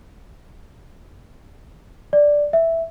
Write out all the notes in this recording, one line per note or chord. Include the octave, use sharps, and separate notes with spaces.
D5
E5